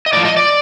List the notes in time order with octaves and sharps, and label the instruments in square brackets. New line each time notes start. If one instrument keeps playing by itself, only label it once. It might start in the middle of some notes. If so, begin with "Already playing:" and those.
[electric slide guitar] D#5
A2 F3 D5
D#5
D5